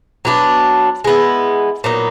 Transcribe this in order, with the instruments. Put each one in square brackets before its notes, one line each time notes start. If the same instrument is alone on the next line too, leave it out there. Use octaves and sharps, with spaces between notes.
[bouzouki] F#3 B3 D4
G#3 B3 E4
A#2 F#3 B3 D#4